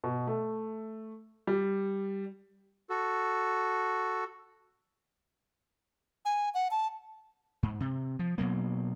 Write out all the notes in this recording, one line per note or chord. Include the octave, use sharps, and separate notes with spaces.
B2
A3
G3
F#4 A4
G#5
F#5
A5
G#2
C3
F3
B2 F#3 A#3